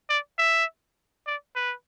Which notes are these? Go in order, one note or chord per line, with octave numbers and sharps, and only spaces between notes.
D5
E5
D5
B4